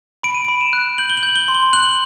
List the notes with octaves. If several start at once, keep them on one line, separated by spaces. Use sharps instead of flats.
B5 D7
D#7
B5 D7
E7
F#6
G6 F#7
G7
F#7
G6
G7
C6
G7
F#6 F#7